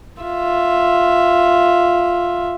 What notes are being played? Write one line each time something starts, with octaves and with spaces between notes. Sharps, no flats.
F4 E5